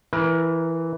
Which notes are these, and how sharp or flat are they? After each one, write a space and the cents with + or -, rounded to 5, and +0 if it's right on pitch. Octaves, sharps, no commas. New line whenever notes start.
E3 +0 A#4 +25